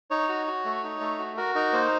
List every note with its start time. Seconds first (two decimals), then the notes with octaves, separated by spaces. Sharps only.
0.11 D#4 C#5
0.29 F#4
0.47 F#4
0.65 A3
0.84 D#4
1.01 A3
1.19 F#4
1.37 F#4 A#4
1.55 D#4 A#4
1.73 A#3 C5